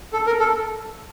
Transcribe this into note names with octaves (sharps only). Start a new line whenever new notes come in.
A4
A#4
A4